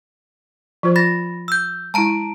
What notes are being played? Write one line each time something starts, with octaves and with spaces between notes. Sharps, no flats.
F3 F4 C5
B5 A6 A#6
E6 G6
G#3 E4 A5 A#5 D7